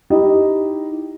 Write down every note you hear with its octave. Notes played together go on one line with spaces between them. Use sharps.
D#4 E4 G4 D#5